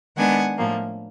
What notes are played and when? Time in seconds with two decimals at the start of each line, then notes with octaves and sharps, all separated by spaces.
0.17 D#3 G#3 B3 D4 F#5 G#5
0.58 A2 F3 A#3